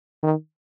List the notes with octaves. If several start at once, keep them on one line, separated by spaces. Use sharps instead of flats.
D#3